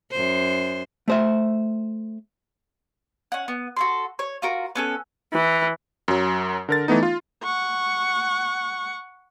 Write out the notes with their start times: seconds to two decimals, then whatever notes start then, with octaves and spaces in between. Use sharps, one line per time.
0.11 F#2 C5
1.08 A3 C5 E5
3.32 C#4 F#5
3.48 B3
3.77 F#4 A4 C6
4.19 C#5
4.42 F4 F#4 A#4
4.75 B3 C#4 A4
5.33 E3
6.08 F#2 F#3
6.69 D3 A#4 A6
6.88 E3 A3 B3 D#4
7.03 F4
7.43 F#5 C#6